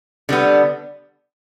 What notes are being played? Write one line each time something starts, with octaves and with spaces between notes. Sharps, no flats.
D3 G3 B3